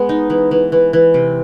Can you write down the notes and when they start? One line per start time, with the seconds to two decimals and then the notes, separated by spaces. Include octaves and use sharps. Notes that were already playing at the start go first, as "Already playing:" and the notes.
Already playing: G#3 B3
0.09 D#4
0.30 E3
0.51 E3
0.72 E3
0.93 E3
1.14 C3